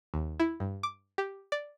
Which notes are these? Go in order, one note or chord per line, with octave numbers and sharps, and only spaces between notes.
D#2
E4
G2
D6
G4
D5